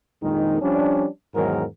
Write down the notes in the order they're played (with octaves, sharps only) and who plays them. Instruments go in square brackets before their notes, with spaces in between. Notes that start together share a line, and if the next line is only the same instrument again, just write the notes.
[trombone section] A#1 F2 D#3 G#3 D#4 A#4
F3 G3 C#4 D4
E2 G#2 D#3 F#3 A#4